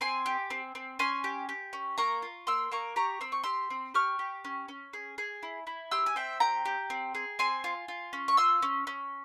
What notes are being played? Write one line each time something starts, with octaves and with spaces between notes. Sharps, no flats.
C4 G#5 C6
G4
C4
C4
C#4 G#5 C6
G4
G4
C#4
A#3 A#5 C#6
F4
A#3 C6 E6
A#3 A#5 C#6
G4 A#5 C#6
C4 E6
C#6
G4 C6 E6
C4
G4 C#6 F6
G4
C#4
C#4
G#4
G#4
E4
E4
G4 C6 E6
G#5
C4 E5 G5
G4 G5 A#5
G4
C4
G#4
C4 G#5 C6
F4
F4
C#4
C#6
F4 C6 E6
C#4
C#4